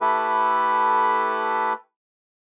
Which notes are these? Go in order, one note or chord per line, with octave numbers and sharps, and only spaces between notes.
A3 E4 G4 A4 B4